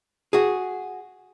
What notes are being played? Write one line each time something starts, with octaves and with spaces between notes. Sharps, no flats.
F#4 G#4